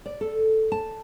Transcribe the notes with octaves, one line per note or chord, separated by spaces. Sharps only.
D5
A4
A5